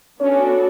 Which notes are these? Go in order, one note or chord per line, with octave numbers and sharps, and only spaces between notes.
B3 C#4 D4 F#4 A4